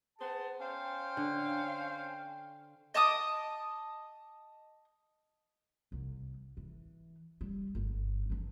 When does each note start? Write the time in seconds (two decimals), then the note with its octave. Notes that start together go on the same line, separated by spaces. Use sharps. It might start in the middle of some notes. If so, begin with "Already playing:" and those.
0.19 B3 G#4 C5 A5
0.60 C#4 C5 F5 G5
1.17 D3
2.94 D#5 A5 D6 D#6
5.92 C2
6.57 E3
7.41 G3
7.75 G1 G2
8.30 E3 D4